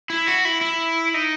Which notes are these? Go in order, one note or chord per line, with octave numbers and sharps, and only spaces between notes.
E4
F#4
E4
E4
D#4